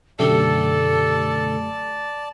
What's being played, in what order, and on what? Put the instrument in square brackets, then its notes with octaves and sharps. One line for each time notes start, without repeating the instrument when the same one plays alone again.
[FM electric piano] F#2 A3 G4 [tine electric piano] B2 D3 [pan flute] A4 [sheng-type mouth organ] D5 A5